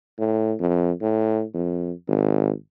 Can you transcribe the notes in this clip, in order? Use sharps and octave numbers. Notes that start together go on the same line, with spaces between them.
A2
F2
A2
F2
G#1